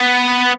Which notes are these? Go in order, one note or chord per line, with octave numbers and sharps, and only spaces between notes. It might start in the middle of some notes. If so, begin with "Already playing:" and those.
Already playing: B3